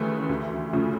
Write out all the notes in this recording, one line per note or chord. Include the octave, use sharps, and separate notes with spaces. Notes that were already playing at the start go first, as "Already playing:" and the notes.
Already playing: D#2 C#3 E3 A3
D2
C#3 F3 A3